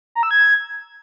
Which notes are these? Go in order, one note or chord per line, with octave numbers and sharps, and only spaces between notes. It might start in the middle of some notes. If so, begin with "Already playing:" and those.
A#5
E6
G#6